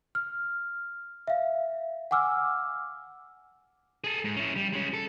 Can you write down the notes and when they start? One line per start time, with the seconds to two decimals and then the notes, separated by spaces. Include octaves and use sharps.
0.15 F6
1.27 E5 F5
2.11 F#5 G#5 D6 E6 F6
4.04 G#4 A4
4.24 G#2
4.37 C#4 E4
4.56 G3
4.73 G#3 C#4
4.94 A4